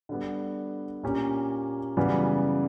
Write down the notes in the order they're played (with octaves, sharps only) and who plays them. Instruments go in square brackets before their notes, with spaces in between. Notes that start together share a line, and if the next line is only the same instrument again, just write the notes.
[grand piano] D3 G3 B3
A#2 A#3 C#4 G4
F#2 C#3 E3 G3 B3